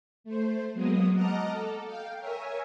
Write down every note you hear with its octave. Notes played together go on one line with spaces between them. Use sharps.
A3 C5
F#3 G#3 A#3 B3 D#6
D#5 F#5 A5 A#5 D6 F6
A4
F5 G5
A#4 C#5 E5 G#5